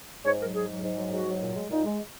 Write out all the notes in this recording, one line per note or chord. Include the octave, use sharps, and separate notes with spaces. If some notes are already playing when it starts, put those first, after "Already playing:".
G#2 C#5
F#3 A#4
G#2 G#4
F#3
G#2
F#3
G#2 F#4
F#3
A#2
G#3
A#2 D#4
G#3